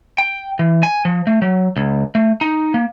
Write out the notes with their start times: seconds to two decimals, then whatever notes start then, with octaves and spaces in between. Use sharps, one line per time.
0.18 G5
0.59 E3
0.83 G#5
1.05 F3
1.27 A3
1.42 F#3
1.77 C#2
2.15 A3
2.41 D#4
2.74 A#3